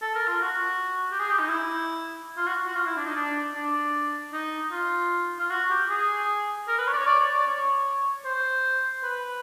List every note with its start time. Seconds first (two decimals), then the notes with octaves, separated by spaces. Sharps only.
0.02 A4
0.15 A#4
0.28 F4
0.41 F#4
1.12 G4
1.19 G#4
1.29 G4
1.39 D#4
1.49 E4
2.37 F4
2.47 F#4
2.67 F#4
2.76 F4
2.86 E4
2.96 D4
3.05 D#4
3.16 D4
3.55 D4
4.33 D#4
4.72 F4
5.39 F4
5.50 F#4
5.70 G4
5.90 G#4
6.68 A#4
6.78 B4
6.87 C#5
6.93 D5
6.97 C#5
7.07 D5
7.20 C#5
7.34 D5
7.47 C#5
8.25 C5
9.03 B4